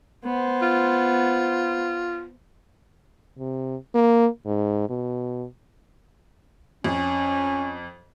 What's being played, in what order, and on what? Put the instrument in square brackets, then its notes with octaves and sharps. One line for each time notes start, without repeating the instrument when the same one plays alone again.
[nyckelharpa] B3 C5
[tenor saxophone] F4
[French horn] C3
A#3
G#2
B2
[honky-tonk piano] F2 [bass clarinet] C#4